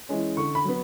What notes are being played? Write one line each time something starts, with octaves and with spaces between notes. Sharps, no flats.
E3 G#3 C#4
D3 C#6
B5
F#3 B3